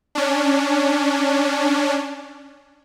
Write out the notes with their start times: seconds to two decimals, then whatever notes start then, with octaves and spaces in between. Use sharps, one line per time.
0.15 C#4 D4